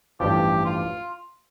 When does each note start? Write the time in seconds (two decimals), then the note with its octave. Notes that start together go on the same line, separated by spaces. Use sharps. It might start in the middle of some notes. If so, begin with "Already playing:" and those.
0.20 A1 G2 F3 G4
0.65 F4